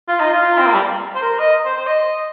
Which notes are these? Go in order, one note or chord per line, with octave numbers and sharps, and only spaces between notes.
F4
D#4
F4
C4
A#3
G3
C5
A#4
D#5
C5
C5
D#5